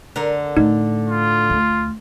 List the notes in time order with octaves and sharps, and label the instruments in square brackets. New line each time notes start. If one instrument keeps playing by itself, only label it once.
[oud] D3 A#4
[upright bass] A2 [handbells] D#4
[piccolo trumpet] F4
[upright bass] D2